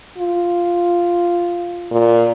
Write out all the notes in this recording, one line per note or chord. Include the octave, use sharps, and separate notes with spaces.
F4
A#2